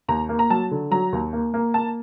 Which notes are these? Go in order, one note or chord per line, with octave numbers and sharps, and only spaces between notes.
D#2 A#5
A#3
A#5
F#3 A5
D3
F#3 A#5
D#2
A#3
A#3
A#3 A5